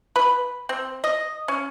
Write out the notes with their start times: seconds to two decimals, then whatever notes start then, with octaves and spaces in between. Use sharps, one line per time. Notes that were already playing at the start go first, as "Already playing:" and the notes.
0.16 B4
0.69 C4
1.04 D#5
1.48 C#4